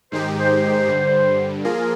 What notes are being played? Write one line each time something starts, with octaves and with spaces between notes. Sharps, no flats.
G#2 D#3 G#3 D#4 G4 C5
C5
G2 D3 G3
F3 A#3 F4 G#4 A#4